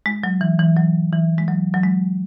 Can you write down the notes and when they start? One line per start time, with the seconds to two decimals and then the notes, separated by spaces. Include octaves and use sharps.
0.06 G#3
0.24 F#3
0.41 E3
0.59 E3
0.76 F#3
1.12 E3
1.38 G#3
1.48 F#3
1.74 F#3
1.83 G#3